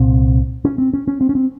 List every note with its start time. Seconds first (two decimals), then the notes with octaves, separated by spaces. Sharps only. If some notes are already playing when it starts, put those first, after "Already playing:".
Already playing: C2 A#2 C4
0.65 C#4
0.78 C4
0.94 C#4
1.08 C#4
1.21 C4
1.29 C#4
1.35 C4